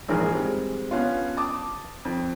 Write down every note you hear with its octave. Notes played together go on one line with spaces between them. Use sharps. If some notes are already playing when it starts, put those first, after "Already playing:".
A#1 G#2 E3 G#4 A#4 G#5
G3 G#3 C4
B3 C#4 D4 F4
A5 D6 D#6
F2